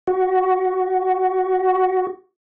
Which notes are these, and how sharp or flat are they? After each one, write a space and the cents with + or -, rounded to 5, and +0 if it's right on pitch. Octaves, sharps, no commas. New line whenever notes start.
F#4 +10